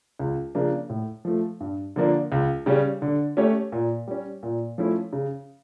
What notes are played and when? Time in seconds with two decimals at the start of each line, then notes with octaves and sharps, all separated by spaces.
0.19 C#2
0.55 C#3 F3 A#3 D4
0.90 A2
1.25 F3 A3
1.60 G2
1.96 D3 F3 A#3 D4
2.32 C#2
2.66 C#3 G3 C#4
3.02 D3
3.37 A3 C#4 G4 C#5
3.72 A#2
4.08 G3 C#4
4.43 A#2
4.78 F3 A3 C#4 E4
5.13 C#3